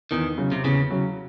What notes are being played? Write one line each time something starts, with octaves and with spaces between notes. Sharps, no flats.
E2 D#3
C#3 F#3
C3
E2 C#3
C#3 F#3